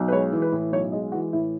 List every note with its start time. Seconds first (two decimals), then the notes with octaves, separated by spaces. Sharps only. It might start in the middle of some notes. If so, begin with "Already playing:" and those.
Already playing: B1
0.08 B4
0.12 G#3 C#5
0.32 E3
0.42 B4
0.52 A2
0.72 B1 C#5
0.92 G#3 D#5
1.12 E3 F#4
1.33 A2 E4